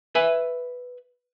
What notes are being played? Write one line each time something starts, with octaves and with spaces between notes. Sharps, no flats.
B4 E5 G#5